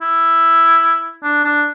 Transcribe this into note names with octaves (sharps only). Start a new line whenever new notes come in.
E4
D4
D4